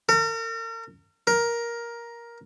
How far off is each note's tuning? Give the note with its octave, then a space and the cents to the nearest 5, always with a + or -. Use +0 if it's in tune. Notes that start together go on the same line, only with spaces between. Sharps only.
A#4 -40
A#4 +10